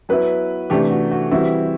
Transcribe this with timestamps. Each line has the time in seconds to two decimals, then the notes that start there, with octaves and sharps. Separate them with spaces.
0.09 F#3 B3 E4 B4
0.70 C3 E3 A3 D4 G4
0.91 F#4
1.11 F#4
1.31 E3 G3 C4 E4 F#4